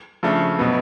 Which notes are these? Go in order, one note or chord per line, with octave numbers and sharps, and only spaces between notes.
C#3 F3 A3 D4
B2 F#3 B3